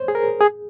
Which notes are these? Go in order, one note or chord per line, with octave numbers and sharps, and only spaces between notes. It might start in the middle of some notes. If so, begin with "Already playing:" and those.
Already playing: C5 C#5
G#4
A#4
G#4